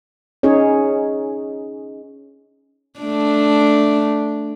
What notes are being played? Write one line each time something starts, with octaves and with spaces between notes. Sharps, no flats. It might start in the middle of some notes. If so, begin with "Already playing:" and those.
C#4 D#4 G#4 C#5
A3 D4